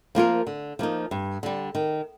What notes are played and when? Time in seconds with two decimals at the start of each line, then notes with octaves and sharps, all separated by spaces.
0.15 F3 A#3 F4 A#4
0.47 D3
0.79 F3 A#3 D#4
1.11 G2
1.43 D3 G3
1.75 D#3